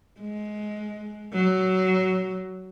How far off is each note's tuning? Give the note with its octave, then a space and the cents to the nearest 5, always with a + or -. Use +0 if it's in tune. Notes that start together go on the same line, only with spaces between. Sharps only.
G#3 +20
F#3 +15